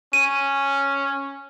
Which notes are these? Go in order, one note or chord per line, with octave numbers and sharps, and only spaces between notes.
C#4 D#7